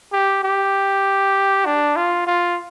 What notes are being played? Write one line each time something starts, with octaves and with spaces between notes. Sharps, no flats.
G4
G4
D4
F4
F4